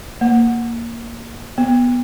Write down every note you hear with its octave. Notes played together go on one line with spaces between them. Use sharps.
A#3
B3